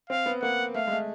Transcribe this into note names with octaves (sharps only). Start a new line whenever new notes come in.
C4 F5
B3
A#3 F#5
A3 F5
G#3
A3